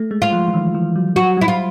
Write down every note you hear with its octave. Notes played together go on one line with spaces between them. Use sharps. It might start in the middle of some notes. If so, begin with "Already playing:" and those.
Already playing: A3
G#3
F4
F3
E3
D#3
E3
F#3
F#3 F#4
G3 E4
F4